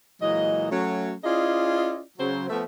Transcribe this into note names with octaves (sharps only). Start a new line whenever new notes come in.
A#2 E3 F#3 G#3 D#5
F#3 A3 C#4
C#4 E4 F4 G#4 D5 D#5
C#3 F#3 C5
F3 A3 B3 E5